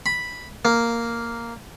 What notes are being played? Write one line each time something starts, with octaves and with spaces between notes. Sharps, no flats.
B5
A#3